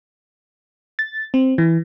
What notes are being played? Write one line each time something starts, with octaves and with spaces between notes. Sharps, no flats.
A6
C4
E3